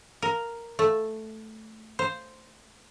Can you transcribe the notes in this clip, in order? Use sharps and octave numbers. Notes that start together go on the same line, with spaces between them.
A#4
A3
C5